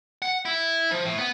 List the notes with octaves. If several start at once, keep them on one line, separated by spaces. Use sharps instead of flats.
F#5
E4
F3
A2
B3